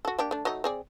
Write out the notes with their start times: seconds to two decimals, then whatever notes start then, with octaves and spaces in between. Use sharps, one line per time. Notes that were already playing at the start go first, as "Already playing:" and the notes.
0.05 F#4 A4
0.19 A#3 D4 G4
0.31 A3 D4
0.45 F#3 A3 D#4
0.64 C4 G#4 D5